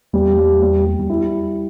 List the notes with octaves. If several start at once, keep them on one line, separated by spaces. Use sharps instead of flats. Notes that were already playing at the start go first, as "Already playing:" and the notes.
E2 G3
G3
G3
G3
E2
E4